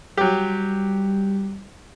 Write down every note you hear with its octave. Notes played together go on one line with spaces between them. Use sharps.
F#3 G3 G4